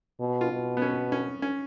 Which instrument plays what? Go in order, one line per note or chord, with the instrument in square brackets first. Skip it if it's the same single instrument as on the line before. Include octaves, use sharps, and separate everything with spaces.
[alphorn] B2
[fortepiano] F4
[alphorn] B2
[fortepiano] B3
C#4
C#4
C#4